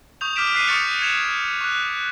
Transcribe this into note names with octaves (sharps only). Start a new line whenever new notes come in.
C#6 D#6 G6 F7
D6 F6 G6 B6 D7 E7
F6 F#6 B6 C7 D7 D#7
C#6 D#6 A6 C#7 F7
G#6 C#7 E7 F7
C#6 F#6